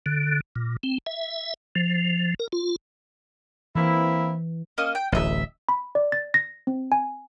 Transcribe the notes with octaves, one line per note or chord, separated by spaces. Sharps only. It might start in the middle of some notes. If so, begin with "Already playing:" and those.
D3
A#2
C4
E5
F3
A#4
F4
E3 A#3 C4 E4
A#3 C#4 D#5
G5
D1 A1 D#5 E5
B5
D5
A6
A#6
C4
G#5